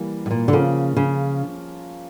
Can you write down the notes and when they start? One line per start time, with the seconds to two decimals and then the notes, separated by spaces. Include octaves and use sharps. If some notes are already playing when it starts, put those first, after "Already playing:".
Already playing: E3 G3 A#3
0.26 A2
0.31 A#2
0.48 D3
0.52 C#3 F3 A#3 C#4 F4
0.96 C#3